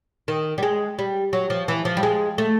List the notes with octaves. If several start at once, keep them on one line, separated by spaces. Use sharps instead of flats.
D#3
G3
G#3
G3
F#3
F3
E3
F3
G3
G#3
A3